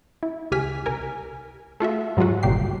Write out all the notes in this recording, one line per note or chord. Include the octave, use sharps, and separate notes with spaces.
E4
C#2 G4 G#5 F6 B6
C2 A#4 G#5
A3 F4 F#4 E5
G#2 F#3 G#3 F4 F#4
G1 C#2 G2 A#2 G4 C7